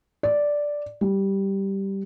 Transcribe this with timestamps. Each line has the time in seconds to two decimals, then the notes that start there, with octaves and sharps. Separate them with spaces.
0.23 D5
1.01 G3